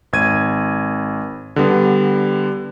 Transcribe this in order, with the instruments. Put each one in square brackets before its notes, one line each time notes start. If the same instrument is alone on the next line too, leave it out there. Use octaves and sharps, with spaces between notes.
[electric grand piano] G#1 G#6 D#7
D3 G3 B3